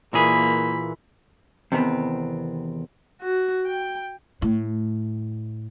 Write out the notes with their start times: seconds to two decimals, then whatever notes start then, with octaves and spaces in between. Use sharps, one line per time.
0.13 A#2 E3 A#3 G#4 B5
1.72 E2 C3 D#3 G#3 B3 C4
3.21 F#4
3.67 G5
4.42 A2